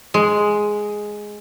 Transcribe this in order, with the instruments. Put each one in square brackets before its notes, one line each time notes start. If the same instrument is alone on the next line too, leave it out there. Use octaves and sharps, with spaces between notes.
[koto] G#3